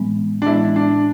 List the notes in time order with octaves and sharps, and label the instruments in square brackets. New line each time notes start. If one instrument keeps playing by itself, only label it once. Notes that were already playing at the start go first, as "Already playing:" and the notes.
Already playing: [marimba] A2 E3 G#3 B3
[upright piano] D4
[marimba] A2 E3 G#3 B3 [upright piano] E4
[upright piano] D4